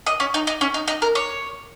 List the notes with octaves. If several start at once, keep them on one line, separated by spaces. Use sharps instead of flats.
D#5
C#4
D#4
D#4
C#4
D#4
D#4
A#4
C#5